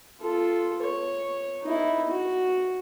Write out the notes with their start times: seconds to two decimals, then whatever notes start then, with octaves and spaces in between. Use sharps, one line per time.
0.21 F4 A4
0.83 C#5
1.63 D#4 E4
2.11 F#4